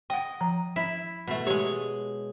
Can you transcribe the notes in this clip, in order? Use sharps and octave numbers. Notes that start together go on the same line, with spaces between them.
D#5 F#5 G5
F3 A#5
E4
B2 A3
G#3 G4 C#5